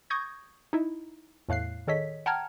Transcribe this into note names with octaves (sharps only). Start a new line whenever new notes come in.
C#6 D#6 G6 G#6 A#6
D#4 E4
E2 A2 F5 F#6 C7
D#3 G#4 A4 C#5 D#5 B6
F#5 G5 A5 A#5 F6 G#6